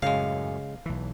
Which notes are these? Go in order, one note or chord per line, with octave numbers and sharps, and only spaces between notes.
F#2 A2 C#3 G#3 F5
B1 E3